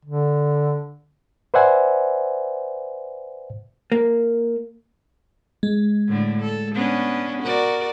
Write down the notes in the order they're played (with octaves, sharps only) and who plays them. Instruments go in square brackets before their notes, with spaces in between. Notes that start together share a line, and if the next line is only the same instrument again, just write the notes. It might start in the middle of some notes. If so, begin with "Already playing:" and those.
[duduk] D3
[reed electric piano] B4 C5 D5 E5 F#5 G#5
[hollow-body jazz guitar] A#3
[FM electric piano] G#3
[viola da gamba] A2 D3 A3
A4
B3 C#4 D4
F#4 A#4 D5